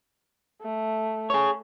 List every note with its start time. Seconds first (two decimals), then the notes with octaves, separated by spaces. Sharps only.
0.61 A3
1.30 G#4 C#5